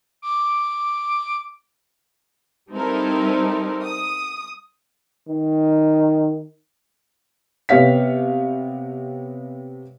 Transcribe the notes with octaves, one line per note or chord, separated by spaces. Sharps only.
D6
G3 C4 D#4 E4 A4 A#4
D#6
D#3
C3 B3 G4 C#5 F5 B6